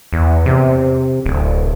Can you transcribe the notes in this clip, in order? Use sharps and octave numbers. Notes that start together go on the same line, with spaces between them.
E2
C3
D1